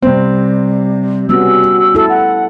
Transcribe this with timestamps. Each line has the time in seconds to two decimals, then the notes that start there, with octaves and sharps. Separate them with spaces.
0.02 C3 G3 C4
1.29 G3 B3 C#4 F#4 E6
1.95 E4 A4
2.09 F#5